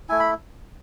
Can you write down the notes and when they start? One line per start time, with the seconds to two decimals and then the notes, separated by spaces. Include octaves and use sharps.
0.09 A3 E4 G#5
0.20 B5